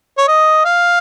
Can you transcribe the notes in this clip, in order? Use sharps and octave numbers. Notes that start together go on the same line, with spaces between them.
C#5
D#5
F5